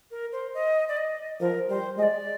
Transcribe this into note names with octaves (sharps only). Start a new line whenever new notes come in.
A#4
C5
D#5
D5
D#5
F3 A#4
G3 C5
G#3 D#5
D5